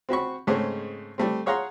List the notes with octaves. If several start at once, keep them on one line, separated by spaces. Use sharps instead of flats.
C4 F#4 B5 C#6
G#2 C#3 G#3 A3 C4 C#4
G3 A3 C4
G#4 C#5 F5 F#5 A#5 C6